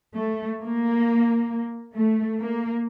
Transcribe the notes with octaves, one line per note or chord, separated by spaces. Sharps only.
A3
A#3
A3
A#3